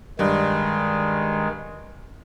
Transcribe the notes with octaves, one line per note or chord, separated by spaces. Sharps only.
G2 D#3 G#3